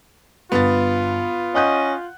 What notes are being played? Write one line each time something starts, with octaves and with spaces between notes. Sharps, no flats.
G1 B3 F4 A6
C#4 D#5 F#5 F#6 G6